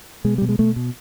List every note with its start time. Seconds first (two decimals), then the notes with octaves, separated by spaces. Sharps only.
0.24 B2 G#3
0.38 B2 G3
0.49 G#3
0.59 B2 A3
0.76 B2